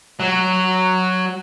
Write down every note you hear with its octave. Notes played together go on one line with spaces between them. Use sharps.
F#3